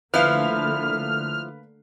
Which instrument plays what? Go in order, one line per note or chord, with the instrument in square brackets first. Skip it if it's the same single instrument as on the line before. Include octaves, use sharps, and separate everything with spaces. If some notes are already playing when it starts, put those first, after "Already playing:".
[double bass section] D3 A3 A#3 [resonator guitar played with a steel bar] F3 E4 [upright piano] B4 F5 [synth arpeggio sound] F6